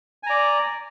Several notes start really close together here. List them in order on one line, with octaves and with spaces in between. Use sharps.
G#5 A#5 D5